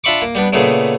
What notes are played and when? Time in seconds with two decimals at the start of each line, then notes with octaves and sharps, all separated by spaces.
0.04 D4 F4 E5 B5 C#6 D6
0.22 A#3
0.35 G3 B3 D4
0.53 A#2 C#3 A3 B3 G#4